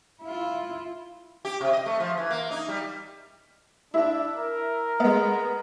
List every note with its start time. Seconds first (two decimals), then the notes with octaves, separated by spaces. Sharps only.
0.23 E4 F4
1.45 G4
1.61 C3
1.73 D#5
1.86 A3
2.00 F3
2.18 E3
2.31 A#3
2.51 D#4
2.68 G3
3.94 D4 E4 E5
4.36 A#4
5.00 G#3 B3